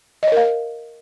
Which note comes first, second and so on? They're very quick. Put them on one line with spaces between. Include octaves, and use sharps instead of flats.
D#5 C#5 A#4 F5